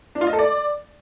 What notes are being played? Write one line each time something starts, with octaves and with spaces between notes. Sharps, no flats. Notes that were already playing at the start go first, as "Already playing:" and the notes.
D4
F4
D#5
A4
D5